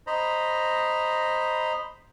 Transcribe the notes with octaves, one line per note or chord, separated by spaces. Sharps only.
C5 D#5 A#5 B5